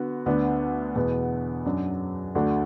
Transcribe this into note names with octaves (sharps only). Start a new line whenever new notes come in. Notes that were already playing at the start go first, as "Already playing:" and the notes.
Already playing: D3 B3 F#4
D2 D3 B3 D4
E2 B2 B3
F#2 F#3 D4
D2 D3 A3 D4 F#4